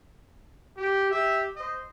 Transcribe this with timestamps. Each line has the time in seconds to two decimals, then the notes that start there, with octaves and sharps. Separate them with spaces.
0.78 G4
1.11 G4 E5
1.57 C5 D#5